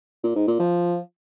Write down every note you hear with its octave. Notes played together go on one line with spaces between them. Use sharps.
A#2
G#2
A#2
F3